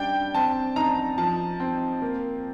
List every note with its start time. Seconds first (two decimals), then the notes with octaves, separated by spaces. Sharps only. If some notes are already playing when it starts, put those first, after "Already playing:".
Already playing: G3 D4 G5
0.35 C4 A5
0.76 D#4 A#5
1.18 F3 A5
1.60 C4
2.02 A#3